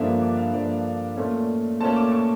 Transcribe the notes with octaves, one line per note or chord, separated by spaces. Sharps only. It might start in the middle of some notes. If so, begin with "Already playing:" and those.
Already playing: G2 D3 F3 A#3 D4 E5
D6
F5
G2 D3 F3 A#3 D4 D5
A#2 A3 C#4
A#2 A3 C#4 A5
D6
C#6